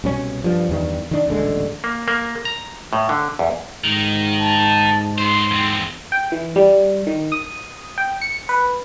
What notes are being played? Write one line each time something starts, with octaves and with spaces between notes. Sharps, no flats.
C2 B2 C#4
G2 F3
E2 G2 D#3
D#3 D4
D#1 A1 D3 G#3
A#3
A#3
A#5
A2
D3
E2
G#2 D#3
A5
B3 C5 C6
E2 C4
G5
E3
G3
D#3
D#6
G5
C#7
B4